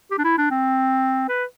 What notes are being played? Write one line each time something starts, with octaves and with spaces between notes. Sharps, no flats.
G4
D4
E4
D4
C4
B4